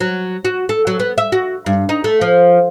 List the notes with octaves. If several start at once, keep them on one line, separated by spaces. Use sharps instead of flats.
F#3
F#4
A4
F#3
B3
E5
F#4
G2
D#4
A3
F3